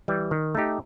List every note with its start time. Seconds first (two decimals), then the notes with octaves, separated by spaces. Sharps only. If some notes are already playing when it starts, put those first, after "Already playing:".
0.08 E3 G3
0.31 D#3
0.55 A3 D#4 G4